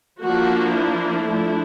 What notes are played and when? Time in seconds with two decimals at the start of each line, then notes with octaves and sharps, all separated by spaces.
0.22 F3 A#3 D4 F#4
0.75 E4
1.28 F3 A3 D4